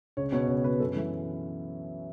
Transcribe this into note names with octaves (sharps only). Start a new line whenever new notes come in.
C#2 C#5
B2 C#5
C#2 C#5
B2 B4
F#2 A4
E3 E4